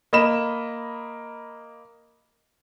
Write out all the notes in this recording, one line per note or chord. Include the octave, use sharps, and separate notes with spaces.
A#3 D#5 B5 E7